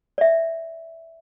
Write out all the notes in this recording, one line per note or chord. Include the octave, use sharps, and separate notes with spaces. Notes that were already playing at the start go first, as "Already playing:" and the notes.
D5 E5